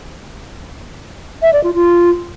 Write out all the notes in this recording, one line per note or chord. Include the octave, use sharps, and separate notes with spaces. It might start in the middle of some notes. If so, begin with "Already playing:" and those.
E5
D5
F4
F4